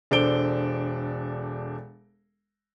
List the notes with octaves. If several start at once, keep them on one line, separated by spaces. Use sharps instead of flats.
E1 D4 A4 C5 D7 G7